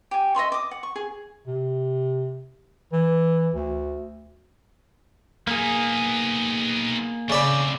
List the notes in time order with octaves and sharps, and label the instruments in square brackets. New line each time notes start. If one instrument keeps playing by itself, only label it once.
[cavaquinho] G4 G#5
D#5 E5 C6 C#6
D6 D#6
F#5
C#6
G#4
[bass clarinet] C3
E3
D2
[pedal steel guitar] A#3 G#4 [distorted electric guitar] B3 D#4
[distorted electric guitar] A2 C4 [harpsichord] C#3 D5 B5